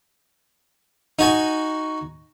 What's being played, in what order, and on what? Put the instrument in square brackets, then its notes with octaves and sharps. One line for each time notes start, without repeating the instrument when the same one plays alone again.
[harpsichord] D#4 F#4 G#5